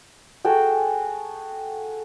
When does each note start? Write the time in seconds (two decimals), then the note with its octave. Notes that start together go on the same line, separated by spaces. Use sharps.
0.45 F#4 G#4 A4 G5